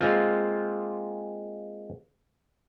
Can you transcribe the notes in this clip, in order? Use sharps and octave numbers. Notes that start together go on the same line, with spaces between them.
G#3 A#3 C4 F4